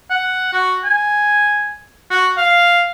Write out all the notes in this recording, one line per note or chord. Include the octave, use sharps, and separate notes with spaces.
F#5
F#4
G#5
F#4
F5